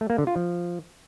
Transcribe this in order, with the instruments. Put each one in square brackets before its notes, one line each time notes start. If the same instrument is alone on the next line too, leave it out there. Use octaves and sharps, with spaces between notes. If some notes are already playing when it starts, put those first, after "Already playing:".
[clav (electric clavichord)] A3
A#3
D3
F4
F3